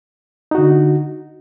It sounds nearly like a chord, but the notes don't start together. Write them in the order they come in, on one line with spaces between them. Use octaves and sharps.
D#4 F#4 D3